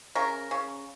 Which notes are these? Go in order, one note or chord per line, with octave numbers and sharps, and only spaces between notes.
C#3 A#4
C#3